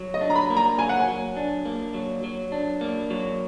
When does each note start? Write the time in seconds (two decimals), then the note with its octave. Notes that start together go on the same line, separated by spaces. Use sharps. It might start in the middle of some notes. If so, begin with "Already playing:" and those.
Already playing: F#3
0.14 D#5
0.21 D4
0.30 A#5
0.35 B5
0.50 A#3
0.57 A#5
0.79 F#3 G#5
0.89 F#5
1.00 G#5
1.08 F#3
1.37 D4
1.65 A#3
1.94 F#3
2.24 F#3
2.52 D4
2.81 A#3
3.10 F#3